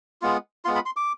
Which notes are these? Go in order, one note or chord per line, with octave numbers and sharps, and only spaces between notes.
G#3 B3 F4
G#3 B3 F4 C6
B5
C6
D6